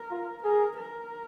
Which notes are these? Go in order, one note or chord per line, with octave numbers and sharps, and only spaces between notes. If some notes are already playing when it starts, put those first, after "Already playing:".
Already playing: A#4
F4
G#4 A#4
A#4